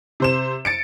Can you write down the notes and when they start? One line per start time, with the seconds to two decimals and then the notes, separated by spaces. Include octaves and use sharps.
0.20 C3 C5 E7
0.65 A6 C#7 D7